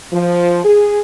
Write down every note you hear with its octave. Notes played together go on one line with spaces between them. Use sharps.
F3
G#4